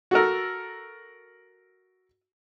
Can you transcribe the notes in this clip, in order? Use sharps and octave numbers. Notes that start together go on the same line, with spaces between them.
F#4 A4 A#4